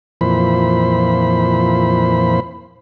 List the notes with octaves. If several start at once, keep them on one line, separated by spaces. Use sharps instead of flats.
F2 A#2 E3 C5 B5